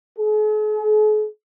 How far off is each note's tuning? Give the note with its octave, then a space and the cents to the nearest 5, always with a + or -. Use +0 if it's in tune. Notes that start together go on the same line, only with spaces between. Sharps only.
G#4 +45